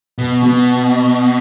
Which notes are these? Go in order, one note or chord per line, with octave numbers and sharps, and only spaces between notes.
B2
B2